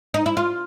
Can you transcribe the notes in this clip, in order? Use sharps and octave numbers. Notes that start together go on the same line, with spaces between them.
D#4
E4
F4